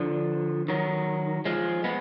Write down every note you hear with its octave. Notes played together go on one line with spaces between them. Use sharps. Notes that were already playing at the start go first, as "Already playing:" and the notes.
Already playing: D3 F3
D#3 F#3
F3 G#3
G#3 B3